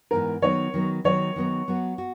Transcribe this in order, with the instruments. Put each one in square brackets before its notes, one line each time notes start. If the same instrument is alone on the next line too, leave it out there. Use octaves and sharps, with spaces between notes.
[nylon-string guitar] G#2 E3 B3 [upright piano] A#4
[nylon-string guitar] D#3 F#3 B3 D#4 [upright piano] C#5
[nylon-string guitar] D#3 F#3 B3 D#4
[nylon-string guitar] D#3 F#3 B3 D#4 [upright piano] C#5
[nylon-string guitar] D#3 F#3 B3 D#4
F#3 B3 F#4
F#4